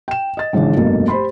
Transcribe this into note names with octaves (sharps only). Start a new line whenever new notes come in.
G5 E7
D#5 A6
G#1 C#3 E3 D4
F1 G2 B2 A#3
G4 C5 B5 C6